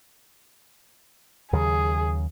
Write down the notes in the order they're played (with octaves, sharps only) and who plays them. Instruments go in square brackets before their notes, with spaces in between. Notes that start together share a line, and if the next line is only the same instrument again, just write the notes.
[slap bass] D#2 C#3 F#3 [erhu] G#4